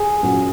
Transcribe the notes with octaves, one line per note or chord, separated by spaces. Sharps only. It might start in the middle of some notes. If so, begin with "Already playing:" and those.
Already playing: G#4
A#2 F#3 A#3 C#4